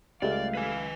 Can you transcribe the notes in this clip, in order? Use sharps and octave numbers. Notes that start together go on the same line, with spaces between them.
C#2 G3 A3 D5 F5
B4 G#5